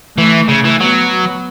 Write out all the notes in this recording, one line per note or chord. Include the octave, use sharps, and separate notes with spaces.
E3 A3
C#3
E3
F#3 B3